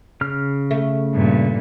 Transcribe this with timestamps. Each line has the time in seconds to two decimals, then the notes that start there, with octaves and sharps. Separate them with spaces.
0.21 C#3 F6
0.71 A3
1.14 G2 A#2